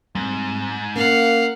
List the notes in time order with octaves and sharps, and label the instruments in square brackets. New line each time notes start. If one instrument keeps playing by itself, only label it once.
[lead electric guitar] G#2 [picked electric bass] G3 B3 C4
[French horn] A#3 [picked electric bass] C#4 [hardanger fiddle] F5 F#5